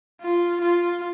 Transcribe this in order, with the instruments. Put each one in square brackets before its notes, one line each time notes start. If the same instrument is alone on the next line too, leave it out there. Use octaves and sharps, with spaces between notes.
[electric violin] F4
F4